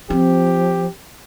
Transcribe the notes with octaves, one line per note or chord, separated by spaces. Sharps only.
F3 C4 G4